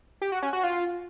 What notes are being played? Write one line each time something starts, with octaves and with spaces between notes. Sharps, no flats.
G4
F#4
C#4
F#4
F4